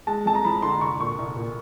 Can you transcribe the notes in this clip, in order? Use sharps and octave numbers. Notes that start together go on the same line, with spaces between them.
G#3 A5
F2 A5
A#5
F3 B5
D3 C6
C2 C#6
A#2 C#6
C2
A#2